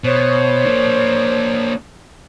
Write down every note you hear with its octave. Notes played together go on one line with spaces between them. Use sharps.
B2 C5 C#5
A#3 D4